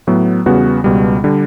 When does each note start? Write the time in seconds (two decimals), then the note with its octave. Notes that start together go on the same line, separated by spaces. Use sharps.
0.07 A2 F#3 B3
0.46 E2 C#3 G3 B3 F#4
0.84 C#2 B2 G3
1.24 D3 G3